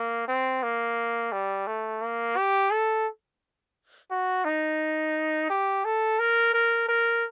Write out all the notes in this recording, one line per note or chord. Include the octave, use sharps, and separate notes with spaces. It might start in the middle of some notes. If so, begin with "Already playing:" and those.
Already playing: A#3
C4
A#3
G3
A3
A#3
G4
A4
F#4
D#4
G4
A4
A#4
A#4
A#4